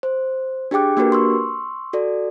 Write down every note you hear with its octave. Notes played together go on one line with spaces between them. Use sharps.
C5
D4 G4 G#4 G5 D6 F#6
A#3 D4 F#4 G4 A#4 B4
C6 C#6 E6
F#4 A4 D5